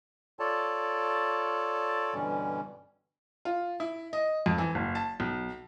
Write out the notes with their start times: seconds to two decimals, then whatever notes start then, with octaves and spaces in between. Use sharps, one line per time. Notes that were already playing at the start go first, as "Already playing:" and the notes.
0.40 F4 A4 C#5 D5 A5
2.14 G2 B2 D3 E3 G3 C#4
3.45 F4
3.80 E4
4.13 D#5
4.46 F2
4.58 E3
4.75 F#1
4.95 A5
5.20 B1